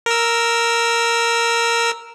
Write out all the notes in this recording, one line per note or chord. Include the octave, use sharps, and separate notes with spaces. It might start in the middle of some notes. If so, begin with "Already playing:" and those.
A#4 E6